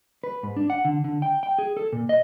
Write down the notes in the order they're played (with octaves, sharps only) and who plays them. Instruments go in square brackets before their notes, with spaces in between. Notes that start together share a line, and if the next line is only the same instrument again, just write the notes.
[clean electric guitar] B4
G#2
D4
F#5
D3
D3
G5
G5
G#4
A4
A#2
D#5